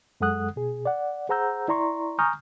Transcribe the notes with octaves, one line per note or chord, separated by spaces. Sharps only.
F#2 G#3 A4 F#5 D#6 F#6
B2 G#4
D5 F#5
G#4 C5 F#5 A#5 E6 G6
E4 D5 A#5 C6 C#6
G#5 A#5 C#6 D#6 F6 G6